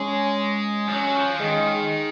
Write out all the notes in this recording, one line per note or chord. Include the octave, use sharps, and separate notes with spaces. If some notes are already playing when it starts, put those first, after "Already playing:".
Already playing: G#3 C#4
F3
F#3 C#4
F3
D#3 G#3